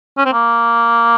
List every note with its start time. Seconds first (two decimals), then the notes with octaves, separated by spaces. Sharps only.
0.18 C#4
0.25 C4
0.33 A#3